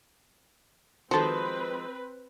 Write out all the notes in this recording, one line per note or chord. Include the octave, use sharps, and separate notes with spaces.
D#3 F3 G#3 C4 F#4 A4 B4 C5